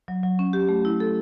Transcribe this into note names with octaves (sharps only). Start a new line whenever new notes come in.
F#3
F#3
C#4
G4
A3
E4
A4